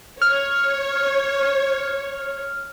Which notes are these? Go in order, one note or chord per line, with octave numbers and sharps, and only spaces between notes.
C#5 F6